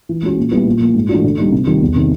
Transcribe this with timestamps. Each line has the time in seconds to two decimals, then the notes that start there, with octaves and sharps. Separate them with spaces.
0.09 E3
0.23 G#3 C#4 F#4
0.38 A#2
0.51 G3 B3 E4
0.66 A#2
0.80 F3 A#3
0.94 G#2
1.09 E3 A3 D4 F#4
1.24 D3
1.38 G3 A#3 D#4
1.52 C3
1.67 D#3 G3
1.81 E2
1.95 C3 D#3